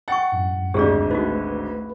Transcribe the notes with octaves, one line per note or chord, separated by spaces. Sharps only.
F#5 G5 C#6 A6
F#2 A2
G#1 D2 G4 G#4 D5
A3 D#4 F#4 B4